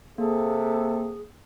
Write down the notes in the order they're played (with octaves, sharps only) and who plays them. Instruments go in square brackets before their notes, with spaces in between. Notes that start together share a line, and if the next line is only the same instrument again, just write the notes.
[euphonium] C3 [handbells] A#3 [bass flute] G#4 [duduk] A4